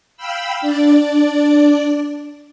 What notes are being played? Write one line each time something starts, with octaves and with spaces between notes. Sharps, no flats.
F5 G5 B5 E6
D4 D5